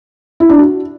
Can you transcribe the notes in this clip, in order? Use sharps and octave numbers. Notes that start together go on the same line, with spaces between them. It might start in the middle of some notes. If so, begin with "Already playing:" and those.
E4
D4
F#4